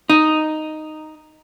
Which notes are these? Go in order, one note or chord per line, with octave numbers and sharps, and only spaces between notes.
D#4